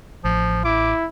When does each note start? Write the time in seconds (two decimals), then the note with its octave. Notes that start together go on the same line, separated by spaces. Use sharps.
0.24 A1 F3
0.65 E4 D6